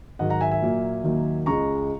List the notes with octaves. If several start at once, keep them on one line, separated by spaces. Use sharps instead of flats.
G#2 D#3 F#3 D#5 F#5
F#5 A#5
E5 G#5
E5 G#5
A#2 F#3 A#3
D#2 D#3 F#3 A#3
C#2 C#3 G#3 A#5 C#6